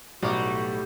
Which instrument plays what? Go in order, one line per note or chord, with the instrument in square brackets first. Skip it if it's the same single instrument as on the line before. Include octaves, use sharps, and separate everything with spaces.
[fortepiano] B1 D6 [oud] A2 [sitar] G3 [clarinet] F#4